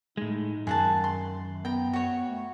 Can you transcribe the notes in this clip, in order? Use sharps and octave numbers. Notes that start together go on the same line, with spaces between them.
A2 G#3 D#4
F#2 D#3 G#4 F#5 A5
C6
B3 G5 A#5
F#4 C#5
A3